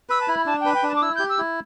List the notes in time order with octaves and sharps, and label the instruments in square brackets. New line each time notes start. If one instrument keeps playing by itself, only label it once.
[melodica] B4 [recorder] E6
[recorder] A5
[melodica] E4 [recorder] B5
[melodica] D4 [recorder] A5
[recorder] G5
[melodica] B4
[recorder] G5
[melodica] D4
[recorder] A5
D6
[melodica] E4 [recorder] E6
[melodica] G4 [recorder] G6
[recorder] E6
[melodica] E4